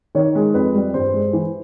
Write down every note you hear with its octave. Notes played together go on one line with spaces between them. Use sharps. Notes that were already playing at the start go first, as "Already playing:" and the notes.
D#3 C#5
G#3
F2 B4
G3
G2 C5
G#3
E3